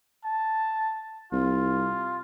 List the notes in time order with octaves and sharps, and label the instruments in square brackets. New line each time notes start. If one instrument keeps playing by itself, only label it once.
[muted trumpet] A5
[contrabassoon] C2 [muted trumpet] F4